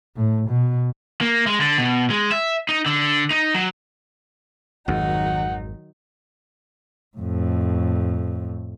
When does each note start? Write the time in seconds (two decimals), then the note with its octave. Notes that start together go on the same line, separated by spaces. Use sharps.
0.16 A2
0.49 B2
1.21 A#3
1.47 G#3
1.61 D3
1.78 B2
2.10 G#3
2.32 E5
2.69 D#4
2.86 D3
3.31 D#4
3.54 F#3
4.88 G#1 F2 D#3 F#3 D#4 F#5
7.17 F2 A2